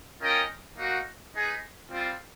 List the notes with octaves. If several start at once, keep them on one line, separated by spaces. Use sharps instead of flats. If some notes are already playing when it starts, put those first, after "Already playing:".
C#4 F4 A#4 D#5 G5
A#3 D#4 F#4
D#4 G#4 B4
G3 C4 F4